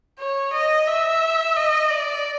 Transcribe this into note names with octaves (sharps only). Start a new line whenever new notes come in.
C#5
D#5
E5
D#5
D5